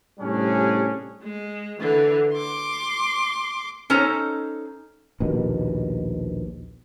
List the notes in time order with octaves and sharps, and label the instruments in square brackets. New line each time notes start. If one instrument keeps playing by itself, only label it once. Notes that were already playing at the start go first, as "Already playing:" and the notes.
[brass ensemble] A2 C3 G3 C#4 D4 G#4
[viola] G#3
D3 E3
C6 D6
[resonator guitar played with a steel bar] C#4 D#4 A4 C5 A#5
[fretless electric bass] A#1 D#2 B2